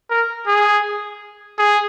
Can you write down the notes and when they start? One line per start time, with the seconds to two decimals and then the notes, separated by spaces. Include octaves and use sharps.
0.10 A#4
0.47 G#4
1.58 G#4